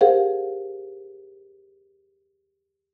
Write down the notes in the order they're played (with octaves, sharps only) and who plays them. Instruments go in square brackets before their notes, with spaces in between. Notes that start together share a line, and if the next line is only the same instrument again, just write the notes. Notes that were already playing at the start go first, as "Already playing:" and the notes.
[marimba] G4 G#4 A#4 C5 F5 F#5